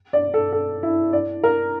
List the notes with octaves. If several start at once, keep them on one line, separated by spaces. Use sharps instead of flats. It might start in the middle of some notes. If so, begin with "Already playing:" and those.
D5
A4
A4
E4
D5
A#4